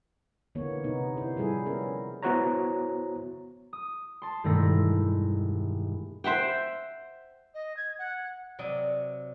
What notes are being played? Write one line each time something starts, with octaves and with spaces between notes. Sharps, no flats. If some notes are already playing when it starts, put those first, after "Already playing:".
D3 E3 A#3 B3 C#5
C3 B3 D#4
E4 C5
F3 G3 E4 G#4 A4
B3 C#4 A#4
B3 E4 F#4 C5 C#5 A#5
D#6
A5 C6
E1 G2 D#3 A3 E6 A#6
C5 E5 F#5 G5
D#5
G#6
F#5
C3 F#3 D5 D#5